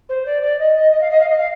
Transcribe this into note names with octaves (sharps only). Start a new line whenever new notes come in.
C5
D5
D5
D#5
D#5
D#5
F5
D#5
F5
D#5
F5